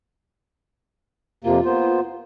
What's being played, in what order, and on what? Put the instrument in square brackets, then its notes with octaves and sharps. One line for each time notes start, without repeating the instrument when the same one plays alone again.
[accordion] F2 C3 A#3 [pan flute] F4
[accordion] A#3 B3 C5